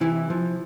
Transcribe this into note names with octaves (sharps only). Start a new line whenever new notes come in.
C3 E3 E4
F3